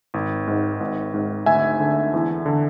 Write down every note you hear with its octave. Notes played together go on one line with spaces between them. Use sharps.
G#1
G#2
G#1
G#2
D2 E5 G#5
D3
E2
D3